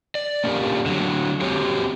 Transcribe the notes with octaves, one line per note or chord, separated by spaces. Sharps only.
D5
A#3 C#4 D4 G4 A#4
D3 F#3
C4 F#4 G4 C#5